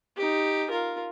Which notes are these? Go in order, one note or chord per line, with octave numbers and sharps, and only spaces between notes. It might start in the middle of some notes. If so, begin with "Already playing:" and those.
D#4 G4
F4 A#4